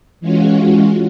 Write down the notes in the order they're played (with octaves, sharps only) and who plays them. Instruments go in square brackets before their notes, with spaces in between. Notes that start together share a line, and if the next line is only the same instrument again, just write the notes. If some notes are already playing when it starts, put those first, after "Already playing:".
[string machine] E3 G#3 C#4 F4 F#4